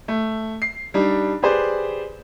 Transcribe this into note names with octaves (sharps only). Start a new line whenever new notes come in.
A3
C7
G3 D4 D#4
G4 G#4 B4 C5 D5